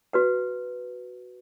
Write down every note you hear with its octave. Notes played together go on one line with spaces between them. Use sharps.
F#4 B4 F#5